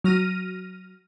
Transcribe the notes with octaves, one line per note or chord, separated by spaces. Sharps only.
F#3 F6 A#6 D#7